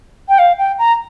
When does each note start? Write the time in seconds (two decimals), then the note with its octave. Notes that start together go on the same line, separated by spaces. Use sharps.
0.29 G5
0.39 F5
0.59 G5
0.79 A#5